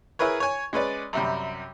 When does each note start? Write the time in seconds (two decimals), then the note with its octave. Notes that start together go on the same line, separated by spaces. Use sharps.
0.19 E4 G#4 A#4 B4 C#5
0.40 C#5 G#5
0.73 G#3 C#4 B4 D5
1.13 F#2 C3 G3